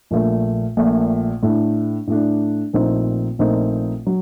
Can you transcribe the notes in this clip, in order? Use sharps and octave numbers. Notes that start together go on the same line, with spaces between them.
A#1 A#2 A3
A#1 A#2 A3
A2 A3 D4
A2 A3 D4
A#1 A#2 A3 C4 D#4
A#1 A#2 A3 C4 D#4
F#3